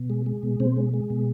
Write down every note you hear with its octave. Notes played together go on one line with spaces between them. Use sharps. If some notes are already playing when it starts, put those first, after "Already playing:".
Already playing: B2
G#3
G#3
B2
B2 C4
G#3
G#3
B2